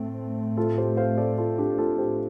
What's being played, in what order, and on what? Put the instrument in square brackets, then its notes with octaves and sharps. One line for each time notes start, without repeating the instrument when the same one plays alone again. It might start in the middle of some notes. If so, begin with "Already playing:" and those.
Already playing: [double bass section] A2 A3 C4
[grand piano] F4 A4
G4 C5
C5 F5
A4 D5
F4 A4
D4 G4
F4 A4
G4 C5